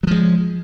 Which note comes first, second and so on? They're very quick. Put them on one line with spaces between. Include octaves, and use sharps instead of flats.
F#3 F3 G#3